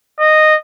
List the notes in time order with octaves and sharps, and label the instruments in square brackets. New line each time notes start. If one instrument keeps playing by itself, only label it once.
[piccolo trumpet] D#5